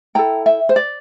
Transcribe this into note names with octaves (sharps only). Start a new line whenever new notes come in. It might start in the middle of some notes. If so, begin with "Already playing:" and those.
E4 A4 G5 A#5
E5 G5
C5
D5